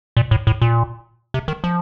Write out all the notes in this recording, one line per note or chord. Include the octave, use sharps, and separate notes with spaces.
A#2
A2
A2
A#2
C3
D#3
F3